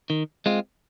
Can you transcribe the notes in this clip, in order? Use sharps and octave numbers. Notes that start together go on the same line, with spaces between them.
D#3
G#3 C4 F4